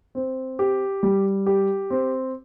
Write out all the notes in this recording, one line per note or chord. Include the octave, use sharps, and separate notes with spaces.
C4
G4
G3
G4
C4